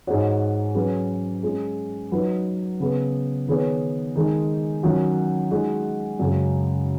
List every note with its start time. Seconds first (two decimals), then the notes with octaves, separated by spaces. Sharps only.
0.07 G#2 G#3 D#4 F#4 C#5
0.75 F#3 C#4 G#4 B4
1.43 G#3 C#4 G#4
2.11 F#3 D#4 B4
2.80 C#3 B3 G#4
3.47 D#3 B3 G#4 C#5
4.16 D#3 G#3 D#4
4.83 D#3 F#3 C#4 F#4
5.51 G#3 D#4 F#4
6.19 F#2 C#3 G#3